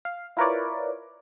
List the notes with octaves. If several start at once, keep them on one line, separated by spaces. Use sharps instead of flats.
F5
E4 F4 A#4 B4 C#5 D5